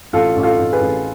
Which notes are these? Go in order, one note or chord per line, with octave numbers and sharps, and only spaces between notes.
A1 F4 A4
A1
F4 A4
A1
G#4 B4
A1